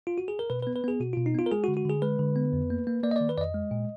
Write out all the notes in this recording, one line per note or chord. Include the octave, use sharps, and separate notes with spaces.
F4
F#4
G#4
A#4
B2 B4
B4
B3
B4
B3 G#4
B2 F#4
B2 F4
D#4
B3 F4
A#4
G#3 G#4
F#4
D3
F#4
D3 G#4
G#3 B4
D3
B3
F2
A#3
A#3
A#3 D5
D#5
D#3 D5
B4
F2 D5 D#5
G#3
A#2